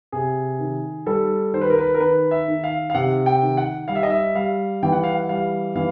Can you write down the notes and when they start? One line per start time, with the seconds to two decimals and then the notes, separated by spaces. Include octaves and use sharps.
0.12 C3 G#4
0.59 D#3
1.06 G3 A4
1.53 D#3 C5
1.62 B4
1.70 A#4
1.78 B4
1.94 A#4
2.00 D#3 B4
2.31 E5
2.48 D#3
2.64 F5
2.90 F5
2.94 C3 F#5
3.26 G5
3.42 D#3
3.57 F#5
3.88 G3 F5
3.95 E5
4.03 D#5
4.10 E5
4.35 G3 F5
4.83 E3 G5
4.93 F#5
5.04 F5
5.15 F#5
5.29 G3 F5
5.75 E3 F5